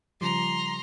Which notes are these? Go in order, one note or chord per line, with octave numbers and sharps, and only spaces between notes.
C#3 F3 G3 A#5 C6